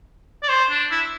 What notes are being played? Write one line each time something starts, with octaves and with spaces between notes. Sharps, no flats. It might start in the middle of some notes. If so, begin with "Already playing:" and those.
D5
C5
D4
E4